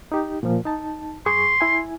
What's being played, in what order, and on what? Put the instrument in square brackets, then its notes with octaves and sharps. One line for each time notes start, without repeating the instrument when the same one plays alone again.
[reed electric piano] D#4 G4
A#2 F3
D#4 A5
[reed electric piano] F#2 G#4 C#6 [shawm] C6
[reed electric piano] E4 G#5